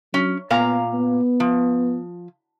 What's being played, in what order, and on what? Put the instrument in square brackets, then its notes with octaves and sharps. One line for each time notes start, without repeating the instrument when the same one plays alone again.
[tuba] F#3 [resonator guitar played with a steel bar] C#4
[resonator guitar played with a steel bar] A#2 F5 A#5 [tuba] B3
[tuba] B3
[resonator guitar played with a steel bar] F3